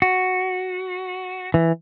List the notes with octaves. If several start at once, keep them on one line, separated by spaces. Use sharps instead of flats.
F#4
E3